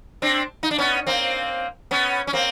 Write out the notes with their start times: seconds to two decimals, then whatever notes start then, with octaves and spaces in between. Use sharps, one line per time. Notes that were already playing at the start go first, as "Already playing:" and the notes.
0.22 C4 D4
0.63 D#4
0.71 D4
0.78 B3 C#4
1.07 A#3 C4
1.91 B3 C#4
2.27 C#4
2.33 A#3 C4